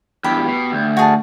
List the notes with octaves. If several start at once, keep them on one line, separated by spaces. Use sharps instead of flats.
E2 G2 G4 B5
B2
D2
F#4 G#4 A5